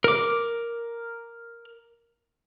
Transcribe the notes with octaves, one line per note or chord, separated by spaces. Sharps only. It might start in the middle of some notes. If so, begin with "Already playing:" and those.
A#4 D6